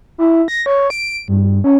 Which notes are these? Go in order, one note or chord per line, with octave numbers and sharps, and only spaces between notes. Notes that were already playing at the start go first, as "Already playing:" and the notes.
E4
A#6
C#5
D7
G2
C#4